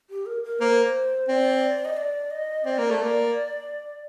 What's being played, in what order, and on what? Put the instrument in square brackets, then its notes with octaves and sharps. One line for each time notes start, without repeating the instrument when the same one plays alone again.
[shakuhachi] G4
A#4
A#4
[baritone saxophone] A#3 [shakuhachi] C5
[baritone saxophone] C4 [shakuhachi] D5
[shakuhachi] D#5
D5
D#5
[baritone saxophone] C4 [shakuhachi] D5
[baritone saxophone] A#3
A3
A#3